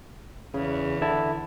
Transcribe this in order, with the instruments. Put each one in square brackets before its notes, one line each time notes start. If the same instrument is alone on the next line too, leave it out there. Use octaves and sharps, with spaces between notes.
[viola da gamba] E2 [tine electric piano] C#3
[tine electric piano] D3 E4 A5